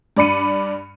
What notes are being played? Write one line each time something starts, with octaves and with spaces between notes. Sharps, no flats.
G2 D5 B5 C#7 D#7